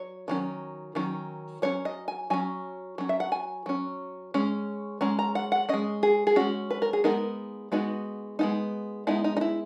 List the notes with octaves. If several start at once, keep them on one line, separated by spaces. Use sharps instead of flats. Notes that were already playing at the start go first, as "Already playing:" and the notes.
Already playing: F#3 C#5
D#3 F#3 C#4
D#3 F#3 C#4
F#3 C#4 C#5
D#5
G#5
F#3 C#4 G#5
F#3 C#4
E5
F#5
G#5
F#3 C#4
G#3 C#4
G#3 C#4 A#5
A#5
F#5
F#5
G#3 C#4 D#5
G#4
G#4
G#3 C#4 F#4
B4
A#4
G#4
G#3 B3 D#4 A#4
G#3 B3 D#4 F#4
G#3 B3 D#4
G#3 B3 D#4 E4
D#4
D#4
E4